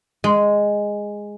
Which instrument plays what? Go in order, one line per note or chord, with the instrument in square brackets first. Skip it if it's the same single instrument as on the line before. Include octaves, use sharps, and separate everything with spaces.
[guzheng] G#3